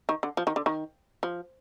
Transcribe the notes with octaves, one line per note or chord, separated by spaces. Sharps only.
D#3
D3
F3
D#3
D3
D#3
F3